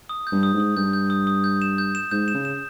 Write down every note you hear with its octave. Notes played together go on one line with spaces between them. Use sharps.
D#6
G6
G2
D#6
G#2
D#6
G2 G6
G6
D#6
D#6
G6
E7
G6
E7
G#2 G6
E7
C#3
E7